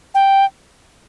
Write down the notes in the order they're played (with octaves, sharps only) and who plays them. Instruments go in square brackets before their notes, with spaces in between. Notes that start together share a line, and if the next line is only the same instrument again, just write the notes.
[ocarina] G5